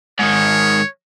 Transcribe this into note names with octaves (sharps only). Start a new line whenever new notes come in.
G#2 D#3 C#5